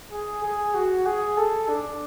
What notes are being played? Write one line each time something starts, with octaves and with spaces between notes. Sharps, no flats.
G#4
G#4
F#4
G#4
A4
D4